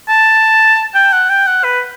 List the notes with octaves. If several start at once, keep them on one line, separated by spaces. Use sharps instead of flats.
A5
G5
F#5
G5
F#5
B4